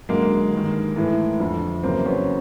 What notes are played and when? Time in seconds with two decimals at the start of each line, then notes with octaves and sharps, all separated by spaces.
0.09 F#2 D3 G#3 A#3
0.53 G2 D#3
0.96 A2 E3
1.40 F2 D3
1.83 F#2 C#3 E3 A#3 C4
2.06 B3 C#4